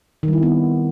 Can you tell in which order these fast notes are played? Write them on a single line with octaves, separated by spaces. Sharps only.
D#3 G3 E4 C4 B3